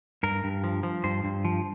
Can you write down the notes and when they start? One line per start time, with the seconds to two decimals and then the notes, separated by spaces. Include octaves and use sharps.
0.23 G2 A#4
0.44 G2
0.64 F3
0.83 F3
1.04 G2 C5
1.24 G2
1.45 F3